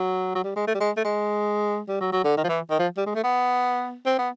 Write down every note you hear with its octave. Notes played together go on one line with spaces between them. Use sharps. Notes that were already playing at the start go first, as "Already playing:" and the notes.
Already playing: F#3
F#3
G3
G#3
A3
G3
G#3
A3
G#3
G3
F#3
F#3
D3
D#3
F3
E3
D#3
F3
G3
G#3
A3
B3
C4
B3